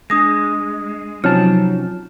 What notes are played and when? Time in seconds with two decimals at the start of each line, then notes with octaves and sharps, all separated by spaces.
0.10 G#3 D4 D#6 A#6
1.24 C3 F3 F#3 C#4 D#4 A5 F6